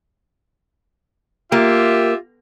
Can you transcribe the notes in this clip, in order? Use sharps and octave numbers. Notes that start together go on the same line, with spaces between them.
A#3 F4 G4 E5